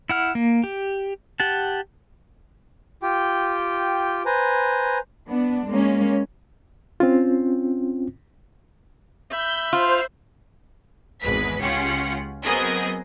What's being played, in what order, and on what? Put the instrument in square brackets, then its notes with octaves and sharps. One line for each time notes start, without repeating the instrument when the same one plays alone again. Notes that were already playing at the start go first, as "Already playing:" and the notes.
[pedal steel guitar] E4 F#5 F6
A#3
G4
G4 F#5 A5
[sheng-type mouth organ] F4 G4 G5
B4 C5 G#5 A#5
[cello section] B3 D4
G#3 A#3 C#4
[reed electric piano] C4 C#4 F4
[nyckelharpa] E5 B5 [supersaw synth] G6
[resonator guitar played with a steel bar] F4 [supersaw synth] C5
[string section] G#1 E2 G#3 B4 B6
C#2 C#4 F4 G4 F#5 C#7
F#3 B3 C4 G#4 A#4 D#5